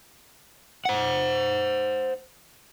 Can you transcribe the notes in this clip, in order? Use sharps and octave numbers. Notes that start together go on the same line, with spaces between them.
C5 F#5